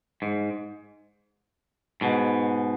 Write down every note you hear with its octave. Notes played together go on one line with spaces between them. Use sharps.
G#2
G#2 B2